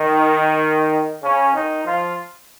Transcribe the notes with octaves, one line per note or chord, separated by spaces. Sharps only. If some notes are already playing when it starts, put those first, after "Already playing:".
Already playing: D#3
C#3 C#4
D#3 D#4
F3 F4